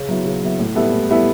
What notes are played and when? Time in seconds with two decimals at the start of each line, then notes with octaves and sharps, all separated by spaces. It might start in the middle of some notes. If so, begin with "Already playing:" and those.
Already playing: C#3
0.08 F#3 B3 E4
0.25 C#3
0.42 F#3 B3 E4
0.59 A2
0.75 G3 B3 E4 A4
0.92 A2
1.09 G3 B3 E4 A4